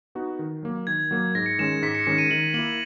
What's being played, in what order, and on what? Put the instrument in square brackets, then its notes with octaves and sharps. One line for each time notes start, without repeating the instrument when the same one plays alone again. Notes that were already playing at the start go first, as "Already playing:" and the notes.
[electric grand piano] B3 D#4 F#4
D#3
F#3 A#3
[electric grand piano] D#3 [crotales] G#6
[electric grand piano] F#3 A#3
[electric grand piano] G#2 [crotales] A#6
[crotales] C#7
[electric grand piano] D#3 G#3 C#4 [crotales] E7
[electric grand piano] G#2 [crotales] B6
[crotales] C#7
[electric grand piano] D#3 G#3 C#4 [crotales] C#7
[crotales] D#7
[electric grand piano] D#3 [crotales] F#7
[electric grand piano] A#3 [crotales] F#7
[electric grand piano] E4